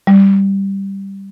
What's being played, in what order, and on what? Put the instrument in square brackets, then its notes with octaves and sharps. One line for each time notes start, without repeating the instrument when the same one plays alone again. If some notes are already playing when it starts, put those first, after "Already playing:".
[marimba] G3